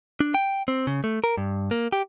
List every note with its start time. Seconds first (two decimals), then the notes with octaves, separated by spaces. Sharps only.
0.20 D4
0.34 G5
0.68 C4
0.87 C#3
1.04 A3
1.24 A#4
1.37 G2
1.71 A#3
1.93 G4